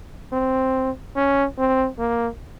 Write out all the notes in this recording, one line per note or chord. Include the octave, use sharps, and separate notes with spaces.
C4
C#4
C4
A#3